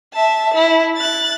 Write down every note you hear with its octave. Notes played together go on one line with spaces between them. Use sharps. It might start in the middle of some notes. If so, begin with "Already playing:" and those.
E5 A5
E4
F#6 A6